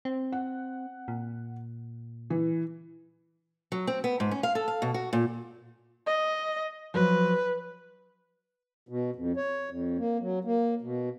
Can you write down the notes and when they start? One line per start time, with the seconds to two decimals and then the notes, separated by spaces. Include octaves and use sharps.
0.05 C4
0.32 F#5
1.08 A#2
2.30 E3
3.72 F#3
3.87 C4
4.04 B3
4.20 G#2
4.31 C#4
4.43 F5
4.55 A4
4.68 F5
4.82 B2
4.94 F#4
5.13 A#2
6.07 D#5
6.94 F3 F#3 B4
8.89 B2
9.16 F2
9.37 C#5
9.69 F2
9.98 A#3
10.21 F#3
10.44 A#3
10.82 B2